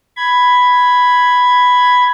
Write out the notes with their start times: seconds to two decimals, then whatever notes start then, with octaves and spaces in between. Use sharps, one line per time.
0.17 B5 G#6